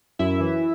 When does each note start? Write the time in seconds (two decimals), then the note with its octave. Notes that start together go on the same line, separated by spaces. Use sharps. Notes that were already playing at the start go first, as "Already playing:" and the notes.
0.19 F#2 E4 E5
0.41 E3